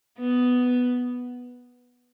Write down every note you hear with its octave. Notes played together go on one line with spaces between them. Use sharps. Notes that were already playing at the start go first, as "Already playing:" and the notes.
B3